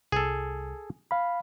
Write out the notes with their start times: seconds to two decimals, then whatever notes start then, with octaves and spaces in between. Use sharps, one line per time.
0.12 C2 G#4 A4
1.11 F5 B5